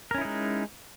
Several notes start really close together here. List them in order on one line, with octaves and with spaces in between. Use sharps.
A#4 C#4 E4 D#4 G#3